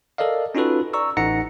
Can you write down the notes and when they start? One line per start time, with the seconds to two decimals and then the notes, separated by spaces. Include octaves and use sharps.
0.18 A4 A#4 D5 D#5 F5
0.55 C#4 D#4 F4 F#4 A4 B4
0.93 D5 A#5 C#6 E6
1.17 A1 D#4 F#5 A#5 A#6 C#7